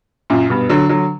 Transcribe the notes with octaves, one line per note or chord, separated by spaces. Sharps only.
F#2 A#2
G2 B2
D3 F#3
D3 F#3